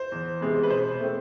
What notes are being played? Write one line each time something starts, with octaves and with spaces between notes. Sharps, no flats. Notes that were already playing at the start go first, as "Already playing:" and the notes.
Already playing: C5
E2
C3 G#3 B3
B4
B2 C5
A3 C4